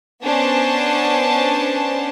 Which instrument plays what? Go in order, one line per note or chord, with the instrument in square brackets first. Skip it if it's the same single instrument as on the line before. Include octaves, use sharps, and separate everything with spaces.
[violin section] B3 C#4 D4 C5 A5